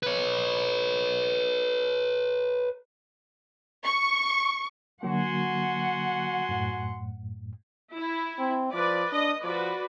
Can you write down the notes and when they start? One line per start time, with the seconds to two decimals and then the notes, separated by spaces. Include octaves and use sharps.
0.03 B4 C#5
3.85 C#6
5.03 D3 F#3 A#3 F#4 F#5 G#5 C6
6.49 F#2 A2
7.95 E4
8.39 C4
8.73 F3 B4 D5
9.12 D4 D#5
9.44 F3 F#4 B4 D5